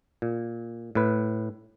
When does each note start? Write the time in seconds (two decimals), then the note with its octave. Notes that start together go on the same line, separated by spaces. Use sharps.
0.22 A#2
0.95 A2 B4